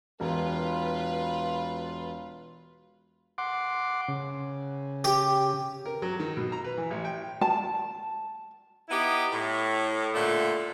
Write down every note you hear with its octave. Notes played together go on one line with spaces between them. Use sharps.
E1 F4 B4
F#5 C6 D6
C#3
G4
A#4
F#3
D#3
B2
A#5
B4
E3
A1
G5
A5
B3 D#4 E4 G4
A2
A#2 D3 A3